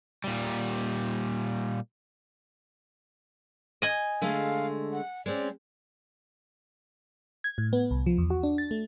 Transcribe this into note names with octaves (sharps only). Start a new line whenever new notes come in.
A#2 G3
D#5 G#5
D3 G#3 A3 F5
F#5
G#3 C4 C#4 D5
G#6
A2
B3
C2
F3
E2
F#4
D4
A6
A3